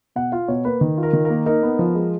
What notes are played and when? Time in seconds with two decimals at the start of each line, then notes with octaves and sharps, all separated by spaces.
0.16 B2 F#5
0.32 F4 F5
0.48 B2 C#5
0.65 A#3 B4
0.81 D#3
0.98 F4
1.03 A#4
1.13 D#3
1.25 A#3 A#4
1.46 D#4 A#4
1.63 B3
1.79 F3
1.95 G#3